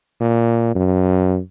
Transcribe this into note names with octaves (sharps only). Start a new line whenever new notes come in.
A#2
F#2